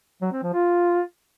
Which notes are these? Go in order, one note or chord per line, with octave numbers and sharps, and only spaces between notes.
F#3
C4
F3
F4